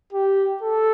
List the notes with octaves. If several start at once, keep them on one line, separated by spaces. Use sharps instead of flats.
G4
A4